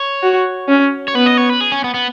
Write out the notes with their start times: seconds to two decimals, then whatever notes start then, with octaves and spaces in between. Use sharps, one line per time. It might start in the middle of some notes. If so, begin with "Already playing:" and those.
Already playing: C#5
0.23 F#4
0.68 C#4
1.08 C#5
1.15 B3 B4
1.26 D#5
1.37 C#5
1.49 B4
1.61 G#4
1.72 C#4
1.84 B3
1.94 B3